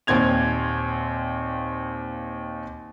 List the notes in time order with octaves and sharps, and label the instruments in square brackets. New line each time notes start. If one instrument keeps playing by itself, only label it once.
[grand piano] D#2 A#2 C4 G#6 F7